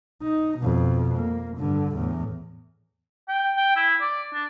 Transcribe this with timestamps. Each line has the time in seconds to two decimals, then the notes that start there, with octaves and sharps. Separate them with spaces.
0.23 D#4
0.58 F2 B2
1.17 A#3
1.57 G2 D3
1.93 E2 A2
3.28 G5
3.57 G5
3.76 E4
4.01 D5
4.33 D4